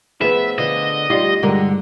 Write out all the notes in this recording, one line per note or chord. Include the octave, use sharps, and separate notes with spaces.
F3 B3 G#4 B4 E5
D3 B3 F4 D#5
G3 D#4 F4
G2 D3 G#3 F#4 A#4